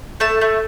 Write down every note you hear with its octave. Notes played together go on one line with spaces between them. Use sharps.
A3 A5
A3